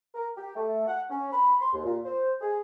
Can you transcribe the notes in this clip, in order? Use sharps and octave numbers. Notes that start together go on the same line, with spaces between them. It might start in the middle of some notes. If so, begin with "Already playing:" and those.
A#4
G4
A3
F#5
C#4
B5
C6
D#2
A#2
C5
G#4